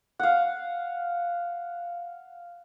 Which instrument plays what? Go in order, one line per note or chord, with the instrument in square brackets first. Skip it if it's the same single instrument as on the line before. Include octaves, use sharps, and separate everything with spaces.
[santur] F5 F#5